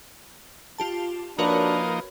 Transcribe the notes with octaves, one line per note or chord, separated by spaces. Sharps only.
F4 G4 A5
F3 A#3 D4 D#4 F#4 A#4 B4 C#5